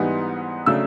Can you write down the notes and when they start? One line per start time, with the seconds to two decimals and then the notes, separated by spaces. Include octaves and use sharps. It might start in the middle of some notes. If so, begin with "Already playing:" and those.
Already playing: G#2 E3 G3 B3 D#4
0.66 C#3 F#3 A3 D4 E6